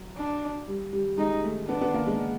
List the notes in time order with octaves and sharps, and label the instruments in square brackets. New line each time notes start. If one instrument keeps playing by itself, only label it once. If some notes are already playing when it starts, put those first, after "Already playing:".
Already playing: [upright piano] F#3
[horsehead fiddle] D4
[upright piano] G3
G3
[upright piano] G#3 [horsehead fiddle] D#4
[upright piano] A3
[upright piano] B3 [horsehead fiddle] D4
[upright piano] B3
A#3
G#3